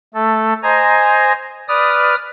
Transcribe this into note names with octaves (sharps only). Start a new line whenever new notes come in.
A3 A4
C5 D#5 G#5 A#5
B4 D5 D#6 F6